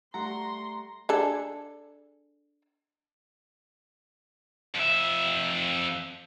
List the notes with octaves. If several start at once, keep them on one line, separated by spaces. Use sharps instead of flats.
G3 A3 F#5 A#5 C6
D4 G#4 A4
F2 E5